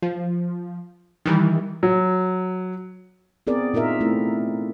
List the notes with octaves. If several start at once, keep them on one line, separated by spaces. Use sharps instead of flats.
F3
D#3 E3 G3
F#3
B3 C4 G#4 A#4 D5
A#2 D#4 F4 A#4 E5
A3 C4 E4